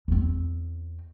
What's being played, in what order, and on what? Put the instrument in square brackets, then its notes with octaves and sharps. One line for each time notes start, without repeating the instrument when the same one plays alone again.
[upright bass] E2 C4